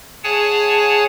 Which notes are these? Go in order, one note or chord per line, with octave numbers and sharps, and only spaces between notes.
G#4 C#5 F#5 G#5 A5